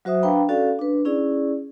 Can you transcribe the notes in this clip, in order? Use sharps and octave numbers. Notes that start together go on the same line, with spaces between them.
F#3 F#4 C5 E5 D#6
D4 B4 F5 G5 A#5 B5
C#4 F#4 A4 D5 F5
D4 B4
C#4 E4 G#4 D5